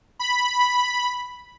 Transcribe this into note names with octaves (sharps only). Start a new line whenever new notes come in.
B5